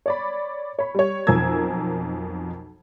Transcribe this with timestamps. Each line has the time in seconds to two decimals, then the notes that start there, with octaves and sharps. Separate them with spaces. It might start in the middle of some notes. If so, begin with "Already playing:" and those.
0.06 C#5 D5 B5
0.79 C#5 B5
0.95 G3 C#5
1.27 B1 F2 A#4 G#5 E6 G#6